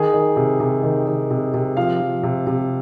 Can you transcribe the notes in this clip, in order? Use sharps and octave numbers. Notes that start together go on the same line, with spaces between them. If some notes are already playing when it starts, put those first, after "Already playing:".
Already playing: D#3 G#4
D#3
C3
C3
D#3
D#3
C3
C3
F3 F5
F3
C3
C3